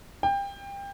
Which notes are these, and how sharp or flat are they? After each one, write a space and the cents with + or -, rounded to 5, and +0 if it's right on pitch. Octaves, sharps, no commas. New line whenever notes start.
G5 +25